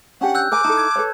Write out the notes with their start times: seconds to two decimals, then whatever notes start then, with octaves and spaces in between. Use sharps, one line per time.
0.21 C#4 D4 G4 F#5
0.35 E6 F#6 G6
0.52 A#4 G#5 D6
0.64 D#4 E4 A4 A5
0.77 G#6
0.96 A4 B4 C#5